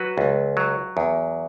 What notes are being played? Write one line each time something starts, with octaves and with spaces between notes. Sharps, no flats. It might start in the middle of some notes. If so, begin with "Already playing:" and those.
Already playing: F#3 F#4 B4
C#2
F#3
E2